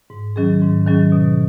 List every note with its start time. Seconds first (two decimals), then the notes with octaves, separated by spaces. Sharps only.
0.10 G#2
0.36 D#3 F#3 C#4 G#4
0.62 G#2
0.86 D#3 F#3 C#4 G#4
1.12 B2